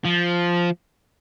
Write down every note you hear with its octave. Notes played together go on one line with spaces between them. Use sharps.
F3